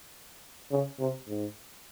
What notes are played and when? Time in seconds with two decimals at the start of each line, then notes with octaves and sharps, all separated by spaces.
0.71 C#3
1.00 C3
1.28 G#2